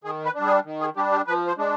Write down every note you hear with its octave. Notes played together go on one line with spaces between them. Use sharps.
D#3 G#4
B4
G3 D4
G#4
D#3
G#4
G3 D4 G4
G4
F3 B4
C5
G#3 D4